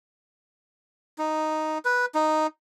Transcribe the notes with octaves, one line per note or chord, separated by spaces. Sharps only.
D#4
B4
D#4